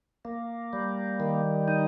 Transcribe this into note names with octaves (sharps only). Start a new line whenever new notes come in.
A#3
G3
D#3
D#4